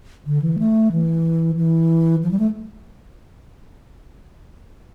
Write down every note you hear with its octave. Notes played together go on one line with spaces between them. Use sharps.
D3
E3
A3
E3
E3
F3
G3
A3